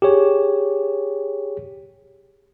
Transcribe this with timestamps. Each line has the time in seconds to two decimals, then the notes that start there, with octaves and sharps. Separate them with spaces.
0.02 G4 G#4 C#5